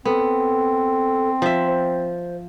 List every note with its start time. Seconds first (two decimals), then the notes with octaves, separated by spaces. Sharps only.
0.05 B3 C4 A4
1.42 F3 E5
1.67 C5